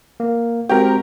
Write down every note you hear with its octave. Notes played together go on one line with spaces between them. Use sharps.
A#3
G#3 C4 F#4 G4 A#4